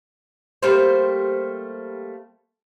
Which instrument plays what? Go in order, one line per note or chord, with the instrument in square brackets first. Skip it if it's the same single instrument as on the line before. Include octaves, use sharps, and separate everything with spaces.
[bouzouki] G3 A3 A#3 C5